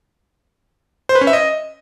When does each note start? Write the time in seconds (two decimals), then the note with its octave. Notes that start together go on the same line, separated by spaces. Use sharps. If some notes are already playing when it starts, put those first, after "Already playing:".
1.09 C5
1.15 B4
1.21 C#4
1.27 E5
1.33 D#5